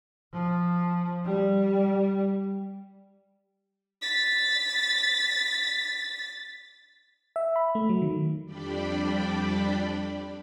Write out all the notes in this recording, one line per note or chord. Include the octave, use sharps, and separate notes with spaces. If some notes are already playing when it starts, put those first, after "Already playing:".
F3
G3
A6 B6
E5
B5
A3
F#3
D#3
F2 G3 D4 D5 G5 B5